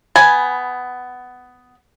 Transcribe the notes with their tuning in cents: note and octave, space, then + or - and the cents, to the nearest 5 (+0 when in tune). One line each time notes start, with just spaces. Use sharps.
B3 +15 G#5 +0 B5 +0